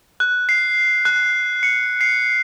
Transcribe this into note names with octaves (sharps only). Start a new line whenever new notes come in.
F#6
C7
F#6
C#7
C7